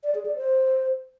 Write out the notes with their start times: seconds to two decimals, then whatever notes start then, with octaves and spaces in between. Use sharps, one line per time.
0.04 D5
0.15 G#4
0.25 D5
0.36 C5